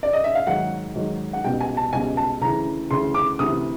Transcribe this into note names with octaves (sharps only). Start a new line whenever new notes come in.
D5
D#5
E5
F5
G#2 D#3 F#3 F#5
G#2 D#3 F#3
F#5
C#2 B2 G3 G5
G#5
A5
C#2 B2 G3 G#5
A5
D2 C#3 E3 A#5
D2 C#3 E3 C6
D6
D2 C3 E3 D#6